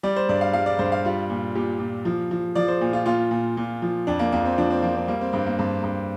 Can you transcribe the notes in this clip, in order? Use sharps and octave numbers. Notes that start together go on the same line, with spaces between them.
G3 D5
C5
G2 D5
F5
G3 F5
D5
G2 C5
F5
G3 F4
A#2
A#2 G4
A#2
F3
F3
F3 D5
C5
A#2
F4
A#2 F4
A#2
A#2
F3
F2 D4
A#3
F2 A#3
C4
F3 D4
C4
F3 A#3
C4
G3 A#3
C4
G2 C4
A#3
G2 C4
G2